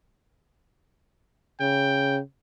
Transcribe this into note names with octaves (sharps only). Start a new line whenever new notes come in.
C#3 G5